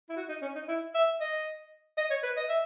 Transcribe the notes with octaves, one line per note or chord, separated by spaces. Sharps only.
E4
F#4
D#4
C#4
D#4
E4
E5
D#5
D#5
C#5
B4
D#5
E5